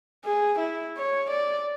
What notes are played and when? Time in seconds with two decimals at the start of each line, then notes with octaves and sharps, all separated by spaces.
0.25 G#4
0.59 E4
0.98 C#5
1.30 D5